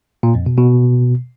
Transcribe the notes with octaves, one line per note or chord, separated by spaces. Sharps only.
A#2
F2
B2
B2